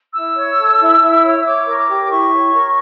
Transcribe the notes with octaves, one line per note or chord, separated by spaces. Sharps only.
E4 E6
C#5
A4
E4
E4
C#5
C#5 D6
A#4
C#6
D6
G4
D6
E4 C#6
C#5
A#4